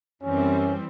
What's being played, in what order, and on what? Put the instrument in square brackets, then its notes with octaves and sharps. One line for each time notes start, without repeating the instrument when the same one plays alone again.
[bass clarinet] F#2 [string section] E3 G3 C4 [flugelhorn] C#4